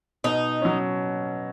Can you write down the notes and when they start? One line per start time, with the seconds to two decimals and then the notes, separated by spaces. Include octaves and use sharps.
0.24 B2 D#4
0.61 F#3 C#4